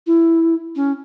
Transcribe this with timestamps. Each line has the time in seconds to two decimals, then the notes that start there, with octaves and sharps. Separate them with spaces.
0.07 E4
0.76 C#4